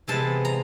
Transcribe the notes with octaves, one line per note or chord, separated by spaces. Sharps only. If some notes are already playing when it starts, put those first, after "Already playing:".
C3 E3 G#3 B3 A5
A#5